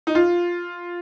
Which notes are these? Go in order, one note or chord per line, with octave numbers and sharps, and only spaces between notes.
D#4
F4